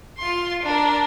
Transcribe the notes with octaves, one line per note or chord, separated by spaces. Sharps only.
F4 C6
D4 A#4